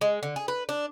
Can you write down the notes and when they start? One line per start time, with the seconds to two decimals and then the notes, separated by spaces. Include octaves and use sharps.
0.01 G#3
0.23 D3
0.36 G#4
0.48 B4
0.69 D4